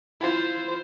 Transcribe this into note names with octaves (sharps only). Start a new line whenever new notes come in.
E4 F4 C5